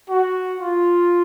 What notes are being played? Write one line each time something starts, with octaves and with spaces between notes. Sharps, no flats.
F#4
F4